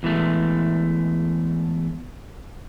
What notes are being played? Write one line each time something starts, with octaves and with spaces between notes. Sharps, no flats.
E2 E3 G#3 A3